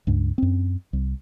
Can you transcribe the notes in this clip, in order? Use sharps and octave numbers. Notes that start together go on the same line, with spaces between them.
C#2 G2
F#2 C4
C2